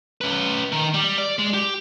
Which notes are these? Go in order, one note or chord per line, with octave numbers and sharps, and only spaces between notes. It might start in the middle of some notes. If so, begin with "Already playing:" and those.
C#4 B4
D#3 A#4
G3
D5
G#3
G4